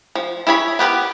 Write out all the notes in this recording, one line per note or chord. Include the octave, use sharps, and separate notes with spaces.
F3
E4 G#4 C#5 B5
B3 G4 A#4 B4